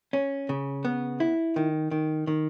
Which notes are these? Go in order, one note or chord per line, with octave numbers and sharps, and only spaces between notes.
C#4
C#3
B3
E4
D#3
D#3
D#3